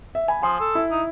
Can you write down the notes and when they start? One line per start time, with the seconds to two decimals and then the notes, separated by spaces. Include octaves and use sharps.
0.15 E5
0.28 G#5 B5
0.42 F3 G#5 C6 D#6
0.60 A4
0.75 E4
0.91 D#4